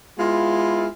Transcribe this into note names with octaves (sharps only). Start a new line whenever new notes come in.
G#3 B3 E4 F4